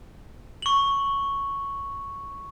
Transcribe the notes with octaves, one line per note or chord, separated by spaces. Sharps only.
C#6 F#7